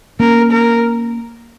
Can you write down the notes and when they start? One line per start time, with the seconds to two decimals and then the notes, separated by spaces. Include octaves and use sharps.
0.20 A#3 C#4 A#4
0.52 A#4